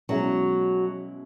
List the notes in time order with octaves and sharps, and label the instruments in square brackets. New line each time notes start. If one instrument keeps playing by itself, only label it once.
[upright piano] B2 G#3 C#4 E4 [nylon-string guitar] F#3